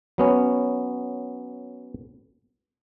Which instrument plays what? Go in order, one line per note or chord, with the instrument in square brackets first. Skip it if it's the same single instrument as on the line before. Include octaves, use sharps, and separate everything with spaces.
[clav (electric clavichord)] F#3 B3 C#4